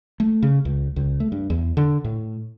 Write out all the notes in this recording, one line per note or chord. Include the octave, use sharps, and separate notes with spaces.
A3
C#3
C#2
C#2
A3
G2
E2
D3
A2